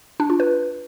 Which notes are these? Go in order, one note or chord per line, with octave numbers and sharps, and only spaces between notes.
D4
F4
B4